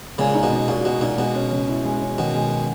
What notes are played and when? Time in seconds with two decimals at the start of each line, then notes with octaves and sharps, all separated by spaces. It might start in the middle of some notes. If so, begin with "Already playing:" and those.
0.18 A#2 C#3 G#3
0.35 D#4
0.43 B2
0.52 C#3
0.68 A#2 F#4
0.85 B2 G#3
1.01 A#2 D#4
1.18 B2 G#3
1.35 C#4
1.52 C#3
1.68 E4
1.85 G#3
2.02 C#4
2.18 B2 D#3
2.35 G#3